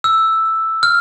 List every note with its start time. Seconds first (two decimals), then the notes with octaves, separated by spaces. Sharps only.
0.04 E6
0.83 F6